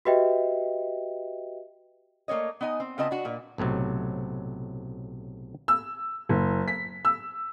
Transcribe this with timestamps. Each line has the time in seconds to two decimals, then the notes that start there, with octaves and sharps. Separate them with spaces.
0.05 F#4 G4 B4 D#5 E5 G5
2.28 A3 A#3 C#4 C#5 D#5
2.61 B3 D#4 D#5 G#5
2.80 C4
2.98 C#3 B3 C4 F4 D#5 A5
3.11 D4 F#4
3.25 A#2 A#3
3.58 B1 A2 C3 F#3
5.68 E6
6.29 F#1
6.68 B6
7.05 E6